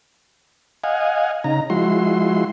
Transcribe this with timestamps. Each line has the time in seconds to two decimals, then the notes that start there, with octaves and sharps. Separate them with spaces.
0.84 D#5 F5 F#5 G#5
1.44 C#3 D#4 A#5
1.70 F3 G#3 E4 F#4 C6